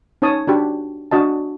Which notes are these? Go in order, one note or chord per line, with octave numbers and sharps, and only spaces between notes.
C#4 D#4 C#5 A5 D#6
D4 F#4 G4
D4 F#4 D#5 A5